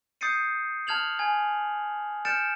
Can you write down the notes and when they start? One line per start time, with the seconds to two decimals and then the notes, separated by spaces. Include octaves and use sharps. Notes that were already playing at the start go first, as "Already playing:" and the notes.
0.21 D#6 G6 A6 C7 C#7 D#7
0.87 A5 F6 G#6 F7 F#7
1.19 G#5 G#6
2.25 F6 G6 A6 C#7 D7 E7